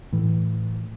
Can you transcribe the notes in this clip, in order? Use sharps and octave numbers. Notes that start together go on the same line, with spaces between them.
A2 E3